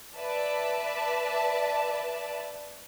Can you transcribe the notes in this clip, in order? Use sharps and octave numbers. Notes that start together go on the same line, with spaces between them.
B4 D5 E5 A5